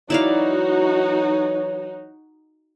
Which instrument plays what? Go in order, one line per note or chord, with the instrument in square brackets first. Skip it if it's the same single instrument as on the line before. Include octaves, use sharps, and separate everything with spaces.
[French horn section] E3 F#3 C#5 [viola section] D#4 F#4 [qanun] E4 D5 F5